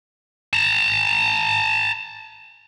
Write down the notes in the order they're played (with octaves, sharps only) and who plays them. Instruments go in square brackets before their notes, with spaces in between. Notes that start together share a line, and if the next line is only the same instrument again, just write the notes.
[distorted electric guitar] A5 A#5